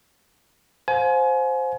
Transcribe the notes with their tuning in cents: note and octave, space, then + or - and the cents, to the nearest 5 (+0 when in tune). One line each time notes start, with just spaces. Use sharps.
C5 +0 F5 +35 G#5 +30